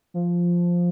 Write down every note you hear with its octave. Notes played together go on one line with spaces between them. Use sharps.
F3